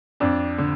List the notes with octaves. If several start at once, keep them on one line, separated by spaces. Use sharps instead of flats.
F2 D4
D3